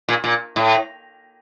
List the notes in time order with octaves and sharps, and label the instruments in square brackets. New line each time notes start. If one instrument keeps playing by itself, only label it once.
[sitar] A#2
A#2
A2